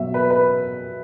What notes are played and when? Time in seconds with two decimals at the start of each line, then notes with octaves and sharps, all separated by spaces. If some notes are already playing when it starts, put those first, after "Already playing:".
Already playing: B2 F#3 E5
0.14 B4
0.30 B4